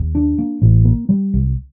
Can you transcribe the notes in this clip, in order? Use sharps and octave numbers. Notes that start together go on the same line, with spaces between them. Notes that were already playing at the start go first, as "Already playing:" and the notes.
Already playing: D#2
D4
A#3
A1
A#3
G3
C2